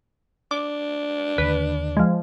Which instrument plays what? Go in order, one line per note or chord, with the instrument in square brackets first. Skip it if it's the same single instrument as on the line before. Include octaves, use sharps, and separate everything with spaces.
[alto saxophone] D4 [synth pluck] D6
[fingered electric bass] D#2 D3 [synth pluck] B4
[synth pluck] F3 G#3